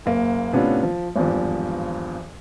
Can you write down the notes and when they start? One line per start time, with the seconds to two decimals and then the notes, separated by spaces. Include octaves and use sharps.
0.06 F#1 A#3
0.53 A2 C3 B3 C#4 D4 F4
0.83 F3
1.15 G#1 E2 G2 F3